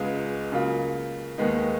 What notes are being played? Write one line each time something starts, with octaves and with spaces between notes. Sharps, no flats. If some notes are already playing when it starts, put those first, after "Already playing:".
Already playing: C#2 C#3 G#3 B3 F4
C#3 F#3 A#3 F4
D#2 D#3 G#3 B3 D#4